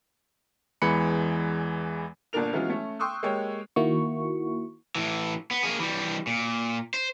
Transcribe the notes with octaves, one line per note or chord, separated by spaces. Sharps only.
E2 E3 G#3 B5 C#7
G1 A#2 D3 D4 A#4 F7
E3 F#3 G#3 B3 C#4 F4
A3 C#4
G5 C6 C#6 D#6 E6 F#6
G#3 A#3 G4 C#5
D#3 A#3 E4 F#4 C#6
A2 E3
B3
A#3 G#4
E3 G3
A#2
C5